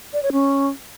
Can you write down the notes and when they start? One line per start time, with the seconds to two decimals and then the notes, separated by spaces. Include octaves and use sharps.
0.13 D5
0.23 C#5
0.32 C#4